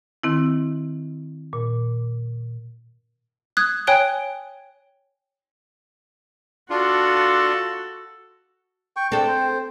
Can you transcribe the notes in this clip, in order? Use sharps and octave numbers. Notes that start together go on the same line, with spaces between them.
D#3 C4 E4
A#2
D#6 F#6 G#6
C#5 G5 G#5 F#6 D7 G7
D4 F4 F#4 A4
G5 C#6
C4 D4 A4 G5
C5